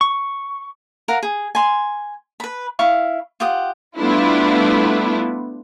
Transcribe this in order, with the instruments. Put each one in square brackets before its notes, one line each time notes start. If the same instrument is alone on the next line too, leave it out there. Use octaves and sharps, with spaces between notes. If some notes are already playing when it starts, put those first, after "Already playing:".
[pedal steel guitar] C#6
[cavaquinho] A#4 F5 F#5
G#4
G#5 C6
B4 B5
E4 F5 C#6
F4 G4 F#5 D#6
[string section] G3 A3 B3 D4 E4 F4